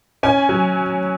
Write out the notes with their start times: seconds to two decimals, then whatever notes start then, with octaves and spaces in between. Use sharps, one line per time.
0.23 C#4 G#5
0.49 F#3